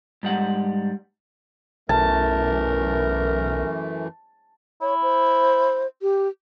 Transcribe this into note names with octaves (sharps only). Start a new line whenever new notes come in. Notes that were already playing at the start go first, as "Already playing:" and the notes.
G#2 G3 F#5
B1 F#2 E3 A3 A#4 A5
E4 C#5
C5
G4